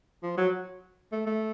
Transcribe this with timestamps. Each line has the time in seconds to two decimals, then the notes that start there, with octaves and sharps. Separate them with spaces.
0.23 F3
0.37 F#3
1.12 A3
1.26 A3